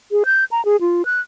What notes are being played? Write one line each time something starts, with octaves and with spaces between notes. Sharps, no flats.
G#4
G6
A#5
G#4
F4
F#6